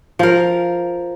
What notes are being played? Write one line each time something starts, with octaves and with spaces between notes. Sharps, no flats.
F3 A#4